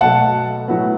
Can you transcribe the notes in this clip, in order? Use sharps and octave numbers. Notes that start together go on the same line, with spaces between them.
B2 F#3 A3 F#5 A5
A2 F#3 B3